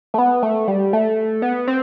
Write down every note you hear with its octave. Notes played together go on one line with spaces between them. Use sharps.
A3
B3
A3
G3
A3
B3
C4